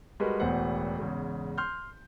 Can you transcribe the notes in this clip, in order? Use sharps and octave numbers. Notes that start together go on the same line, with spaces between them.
G3 G#3 F#4 A#4 B4 D#5
E1 E2 A2 B3 C5 F#5
E2 G#2 C#3
C6 F6 G6